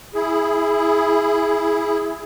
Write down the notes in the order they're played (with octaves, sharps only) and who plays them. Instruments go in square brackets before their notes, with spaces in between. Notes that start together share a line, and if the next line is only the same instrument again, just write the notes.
[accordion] E4 G#4